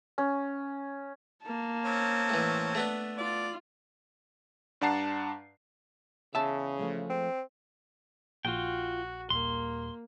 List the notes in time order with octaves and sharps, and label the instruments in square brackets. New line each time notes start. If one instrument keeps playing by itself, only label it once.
[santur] C#4
[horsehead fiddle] A#3 A5
[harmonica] C4 C#4
[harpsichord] A2 E3
A3 B3 D4
[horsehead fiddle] F4 [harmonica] D5
[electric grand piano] G2 D4 F#5 A5 A#5 C7
[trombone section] E2 C#3 [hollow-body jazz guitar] E5 A5
[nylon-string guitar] F3 G#3 A3
[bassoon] C4
[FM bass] A#1 [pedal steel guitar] F4 G5 [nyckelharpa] F#4
[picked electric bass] D#1 [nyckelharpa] A#3 [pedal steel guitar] C6